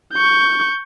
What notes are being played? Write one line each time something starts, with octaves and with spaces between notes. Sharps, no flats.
C#6 G6